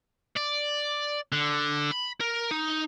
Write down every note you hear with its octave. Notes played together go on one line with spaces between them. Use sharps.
D5
D3
B5
A#4
D#4